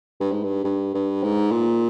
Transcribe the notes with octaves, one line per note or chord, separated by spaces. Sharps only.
G2
G#2
G2
G2
G2
G#2
A#2